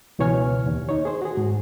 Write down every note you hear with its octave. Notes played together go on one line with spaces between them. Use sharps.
C#2 B2 E3 C#5 G#5 F6
D#2
D#4 C#5
G#4 C5
F#4 G#4
G#2